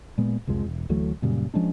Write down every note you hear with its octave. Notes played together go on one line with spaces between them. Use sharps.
A#2 G#3 B3
C2 F2 F3 G#3
E1
D2 E3 F#3 A3
F#2 A#2 C#3 G3
F3 G#3 C#4 D4